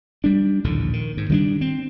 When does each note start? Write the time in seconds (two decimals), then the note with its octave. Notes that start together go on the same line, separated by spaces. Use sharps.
0.24 G3 D4
0.64 A#1 D#2 A2 D3
0.93 D#3
1.17 G#2
1.29 D#3 G3 A3 D4
1.61 C4